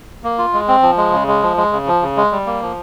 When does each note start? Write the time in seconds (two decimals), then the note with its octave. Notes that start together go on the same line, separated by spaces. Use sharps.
0.24 A#3
0.38 F4
0.53 G#3
0.68 C4
0.82 F3
0.97 G#3
1.12 C#3
1.28 G#3
1.43 F3
1.57 G#3
1.72 C#3
1.87 F3
2.02 C#3
2.17 G#3
2.32 G3
2.46 A#3
2.62 F3